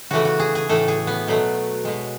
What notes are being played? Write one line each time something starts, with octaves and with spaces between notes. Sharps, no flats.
C#3 E3 A3 F#4
F#4
G#4
G#4
A2 E3 A3 A4
G#4
B3
B2 F#3 A3
B2 G#3